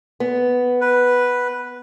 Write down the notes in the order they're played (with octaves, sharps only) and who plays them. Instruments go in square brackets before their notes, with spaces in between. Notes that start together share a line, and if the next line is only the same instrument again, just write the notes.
[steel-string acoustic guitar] B3
[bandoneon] B4